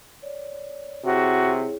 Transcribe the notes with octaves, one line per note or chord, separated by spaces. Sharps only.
C#5 D5
C3 E4 F#4 G#4 C#5